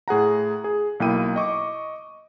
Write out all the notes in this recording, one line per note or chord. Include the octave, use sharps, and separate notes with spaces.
A2 G#4 F#5 A#5
G#4
B1 A#3 E4 G5 D#7
D#5 C#6 D6